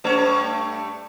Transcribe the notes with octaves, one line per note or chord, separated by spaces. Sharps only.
G2 A3 C#5